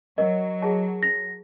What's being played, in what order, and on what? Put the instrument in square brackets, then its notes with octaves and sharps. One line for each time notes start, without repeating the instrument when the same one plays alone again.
[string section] F#3 [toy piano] A#4 [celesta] D#5
[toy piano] G#4 E5 A5
[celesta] A#6